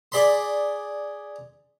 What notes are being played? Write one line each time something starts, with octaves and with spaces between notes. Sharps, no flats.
G#4 D5 B5 C6